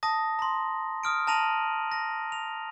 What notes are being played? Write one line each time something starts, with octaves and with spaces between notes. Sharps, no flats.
A5 D#6 A#6
A#5 C6
D#6 F6 D7
A5 A#5 A#6 D#7 F7 F#7
A#6
F7